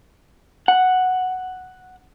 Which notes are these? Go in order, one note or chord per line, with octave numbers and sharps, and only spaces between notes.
F#5